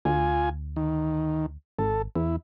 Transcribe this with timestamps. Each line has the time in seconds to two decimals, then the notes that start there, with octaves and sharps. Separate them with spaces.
0.05 D2 F4 G#5
0.76 D#3
1.79 G#1 A4
2.16 E2 E4